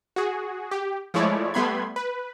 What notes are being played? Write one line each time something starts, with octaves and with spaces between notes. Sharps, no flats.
F#4 G#4
G4
F3 G#3 A3 E4 C#5 D5
G3 A3 B3 B5 C6 G#6
B4